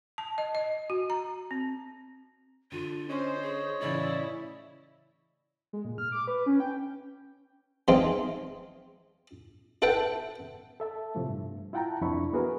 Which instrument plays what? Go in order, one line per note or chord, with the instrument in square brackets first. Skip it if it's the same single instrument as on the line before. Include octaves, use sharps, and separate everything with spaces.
[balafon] A5
D#5
D#5
F#4
A#5
C4
[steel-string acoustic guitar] D3 [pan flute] F4
[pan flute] C#4 [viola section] C5 [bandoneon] C#5 D#5
[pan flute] G#4
[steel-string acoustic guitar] A2 C#3 E3 [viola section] E4 [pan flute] D5
[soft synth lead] G#3
A#2
F6
D6
B4
C#4
G5
[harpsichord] E3 F3 G#3 C4 D#4 F4
E4 A4 B4 F#5 G5
[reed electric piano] A4 E5 A5
A2 C3 F3 A3
G2
E4 F4 F#5 G5 A5 A#5
C2 F2 D4 E4 B5 C#6
A#3 B3 F#4 G#4 A#4 B4